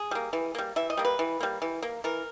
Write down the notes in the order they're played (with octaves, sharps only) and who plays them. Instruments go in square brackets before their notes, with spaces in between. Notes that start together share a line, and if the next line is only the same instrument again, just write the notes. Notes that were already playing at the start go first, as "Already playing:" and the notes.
Already playing: [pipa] G#4
G3 A#3
E3
G3 A#3
E3 E5
D#5
G3 A#3
B4
E3
G3 A#3
E3
A#3
E3 A#4